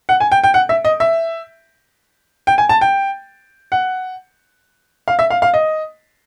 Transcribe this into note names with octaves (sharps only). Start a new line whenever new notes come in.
F#5
G#5
G5
G5
F#5
E5
D#5
E5
G5
G#5
A5
G5
F#5
F5
E5
F5
F5
D#5